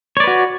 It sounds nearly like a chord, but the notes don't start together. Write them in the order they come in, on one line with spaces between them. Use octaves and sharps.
C#5 D5 B4 F#4